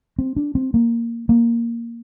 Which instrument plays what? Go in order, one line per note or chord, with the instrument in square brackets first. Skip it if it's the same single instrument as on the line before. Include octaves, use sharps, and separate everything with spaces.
[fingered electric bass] C4
D4
C4
A#3
A#3